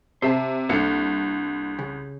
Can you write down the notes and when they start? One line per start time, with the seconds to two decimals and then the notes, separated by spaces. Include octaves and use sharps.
0.22 C3 C5 E5 A5
0.69 C2 A#3 D4 A4 C#7
1.79 C#3